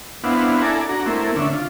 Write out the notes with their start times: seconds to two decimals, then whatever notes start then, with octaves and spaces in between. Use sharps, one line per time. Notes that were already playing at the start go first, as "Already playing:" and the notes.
0.24 B3 C4 D4 E4 F5 F#5
0.62 E4 A4 D5 G#5 A#5
0.89 D4 F#4 A#5
1.06 A3 A#3 C4 E4
1.36 D3 C#4 D4 E5
1.53 F4